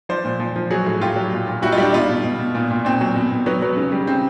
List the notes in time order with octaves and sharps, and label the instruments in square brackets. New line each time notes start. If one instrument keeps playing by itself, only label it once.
[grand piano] F3 C5 D5
A#2
F3
F3
F#3 F#4 G#4
A2
A2 F4 G4
F#3
A#2
A#2
G3 E4 F#4
D#4 F4
G3 D4 E4
B2 D#4 F4
B2
B2
B2
A#2
A#2
A#2 C4
F#3
B2
B2
F#3 B3
F#3
C#3
G3
C#3 C4